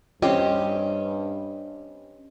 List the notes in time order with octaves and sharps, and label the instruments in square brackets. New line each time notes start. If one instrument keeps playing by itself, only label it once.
[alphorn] G2 [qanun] C4 G4 [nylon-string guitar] C#4 [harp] D#5